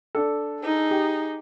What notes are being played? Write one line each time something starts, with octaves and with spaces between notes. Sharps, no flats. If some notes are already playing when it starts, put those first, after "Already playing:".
D4 A4
D#4 G#4
G4